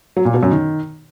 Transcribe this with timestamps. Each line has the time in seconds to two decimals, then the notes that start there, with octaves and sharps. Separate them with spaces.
0.17 F#3
0.25 A#2
0.34 B2
0.43 F#2
0.51 D#3